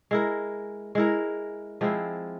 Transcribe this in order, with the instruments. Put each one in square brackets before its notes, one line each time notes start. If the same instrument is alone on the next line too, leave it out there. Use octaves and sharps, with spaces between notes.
[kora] G#3 E4 A#4
G#3 E4 A#4
F3 G#3 C4 E4